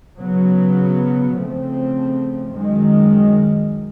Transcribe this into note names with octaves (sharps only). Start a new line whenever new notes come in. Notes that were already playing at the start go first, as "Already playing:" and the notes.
C#3 F#3 B3
C#3 F3 A3 C4
F#2 D#3 G#3